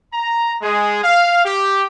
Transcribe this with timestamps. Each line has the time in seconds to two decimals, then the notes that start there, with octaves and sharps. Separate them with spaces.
0.14 A#5
0.62 G#3 G#4
1.04 F5
1.45 G4